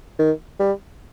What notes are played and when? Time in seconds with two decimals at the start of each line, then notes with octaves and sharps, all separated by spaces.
0.19 D#3
0.60 G3